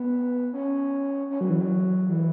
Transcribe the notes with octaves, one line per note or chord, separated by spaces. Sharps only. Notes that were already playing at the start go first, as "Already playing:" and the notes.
Already playing: B3
C#4
C#4
F#3
E3
F#3
E3